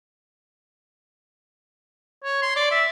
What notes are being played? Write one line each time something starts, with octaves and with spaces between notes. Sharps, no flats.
C#5
C6
D5
E5